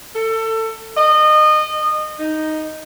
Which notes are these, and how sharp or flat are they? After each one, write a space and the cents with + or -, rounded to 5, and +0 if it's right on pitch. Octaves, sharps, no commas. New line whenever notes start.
A4 +25
D#5 -25
D#4 +5